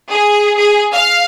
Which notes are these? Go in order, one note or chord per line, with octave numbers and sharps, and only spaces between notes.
G#4
G#4
F5